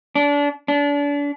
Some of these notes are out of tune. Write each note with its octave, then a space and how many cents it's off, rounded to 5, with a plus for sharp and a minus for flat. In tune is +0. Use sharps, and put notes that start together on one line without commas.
D4 -30
D4 -35